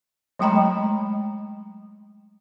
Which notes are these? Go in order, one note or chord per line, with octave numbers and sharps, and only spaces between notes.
F#3 G#3 A3 G5 A#5 B5